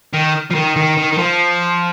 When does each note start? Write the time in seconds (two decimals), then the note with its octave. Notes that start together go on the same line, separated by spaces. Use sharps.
0.14 D#3
0.51 F3
0.55 D#3
0.77 D#3
0.97 D#3
1.12 D#3
1.18 F3